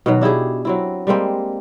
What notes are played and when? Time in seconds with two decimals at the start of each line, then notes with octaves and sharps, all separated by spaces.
0.06 B2 D#3 F#3
0.21 D4 E4 G4 G#4
0.65 F#3 C4 E4
1.07 G3 G#3 A#3 C4